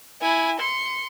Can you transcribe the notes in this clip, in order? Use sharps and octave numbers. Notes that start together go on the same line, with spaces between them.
E4 G#5
C6 C#7